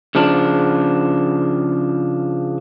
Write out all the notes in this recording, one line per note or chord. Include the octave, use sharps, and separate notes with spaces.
C#3 F3 D4